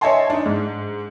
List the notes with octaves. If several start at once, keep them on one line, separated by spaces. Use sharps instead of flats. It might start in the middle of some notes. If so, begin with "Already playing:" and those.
C#5 D#5 E5 G#5 A5 C6
D4 D#4
G#2